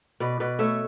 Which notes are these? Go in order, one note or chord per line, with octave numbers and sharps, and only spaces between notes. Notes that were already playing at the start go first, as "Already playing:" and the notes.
B2 B4 D5
B2 B4 D5
A3 C#5 E5